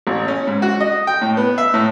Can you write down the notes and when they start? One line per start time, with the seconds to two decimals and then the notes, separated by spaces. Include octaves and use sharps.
0.07 A1
0.28 C#4
0.47 G#2
0.62 F#4
0.80 D#5
1.07 G5
1.22 A2
1.37 B3
1.58 E5
1.74 A2